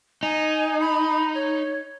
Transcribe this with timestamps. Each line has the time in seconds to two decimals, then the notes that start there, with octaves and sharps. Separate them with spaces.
0.23 D#4 G#5
0.80 B5
1.35 C#5